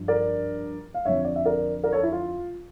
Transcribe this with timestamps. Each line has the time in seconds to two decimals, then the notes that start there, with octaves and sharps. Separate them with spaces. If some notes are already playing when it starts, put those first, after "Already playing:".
Already playing: G2 F3
0.08 A#4 D5
0.94 F5
1.05 F2 D3 F3 C#5 E5
1.24 D5
1.36 E5
1.45 A#4 D5
1.84 A#4 D5
1.92 A4 C#5
2.03 E4
2.12 F4